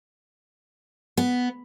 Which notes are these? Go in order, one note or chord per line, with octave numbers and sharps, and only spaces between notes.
B3